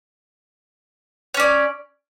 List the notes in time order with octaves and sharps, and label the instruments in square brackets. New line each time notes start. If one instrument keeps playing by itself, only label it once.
[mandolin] C#5
C#4
D5